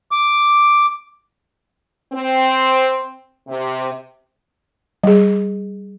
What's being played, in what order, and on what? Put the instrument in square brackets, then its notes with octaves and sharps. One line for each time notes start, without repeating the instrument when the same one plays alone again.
[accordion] D6
[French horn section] C4
C3
[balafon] G3 G#4